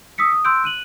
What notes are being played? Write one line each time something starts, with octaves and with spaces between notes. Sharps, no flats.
D#6 E6 B6 C#7
D#6
C6 E6 F#6 G6 D7
F#6 D#7 F#7